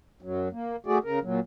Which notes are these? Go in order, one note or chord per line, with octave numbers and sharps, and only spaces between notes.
F#2 F#3
A#3
A3 F#4 G#4 D5
C#3 A#4
A#2 F#3